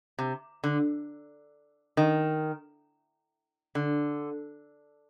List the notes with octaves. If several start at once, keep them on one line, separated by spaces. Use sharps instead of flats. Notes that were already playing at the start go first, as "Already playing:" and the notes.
C3
D3
D#3
D3